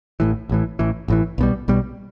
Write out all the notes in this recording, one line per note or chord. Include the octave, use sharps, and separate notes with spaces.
A1 A2 E3
A1 A2 E3
A1 A2 E3
A1 A2 E3
B1 B2 G3
B1 B2 G3